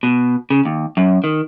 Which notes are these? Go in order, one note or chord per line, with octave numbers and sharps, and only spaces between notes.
B2
C#3
D#2
F#2
D#3